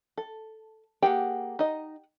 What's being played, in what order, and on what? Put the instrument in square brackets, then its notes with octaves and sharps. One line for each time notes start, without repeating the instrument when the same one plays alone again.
[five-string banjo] A4
[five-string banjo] A#3 G#4 G5 [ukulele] G4 F#5
[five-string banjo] D#4 D#5